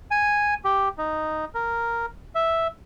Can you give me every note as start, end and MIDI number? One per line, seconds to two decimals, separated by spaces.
0.11 0.54 80
0.65 0.89 67
0.98 1.45 63
1.55 2.06 70
2.35 2.67 76